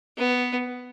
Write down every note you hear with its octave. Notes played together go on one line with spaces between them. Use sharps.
B3